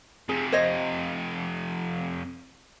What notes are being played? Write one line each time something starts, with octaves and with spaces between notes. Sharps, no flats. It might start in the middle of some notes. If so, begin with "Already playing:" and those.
F2 C3 G#4
C5 C#5 D#5